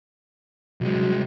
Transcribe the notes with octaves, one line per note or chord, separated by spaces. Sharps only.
C2 F#3 G#3